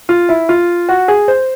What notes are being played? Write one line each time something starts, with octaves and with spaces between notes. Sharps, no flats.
F4
E4
F4
F#4
G#4
C5